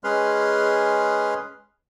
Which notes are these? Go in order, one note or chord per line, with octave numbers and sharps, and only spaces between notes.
G#3 C#4 G#4 B4 C6 F6